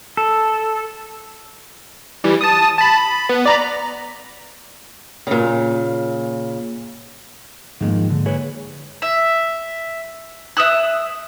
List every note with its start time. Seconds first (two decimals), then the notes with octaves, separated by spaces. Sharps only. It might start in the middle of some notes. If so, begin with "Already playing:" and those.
0.17 A4
2.24 E3 G3
2.41 A5 D#6
2.78 A5 B5
2.98 B5
3.29 B3
3.46 D5 A#5 B5
5.27 A#2 C#3
7.81 F2 G#2 D#3 G#3 A#3
8.10 D3
8.26 G#4 B4 C#5
9.02 E5
10.57 E5 D#6 E6 F#6